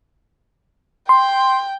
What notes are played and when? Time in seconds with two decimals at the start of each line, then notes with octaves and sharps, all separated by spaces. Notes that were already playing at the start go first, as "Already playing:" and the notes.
1.09 G5 C6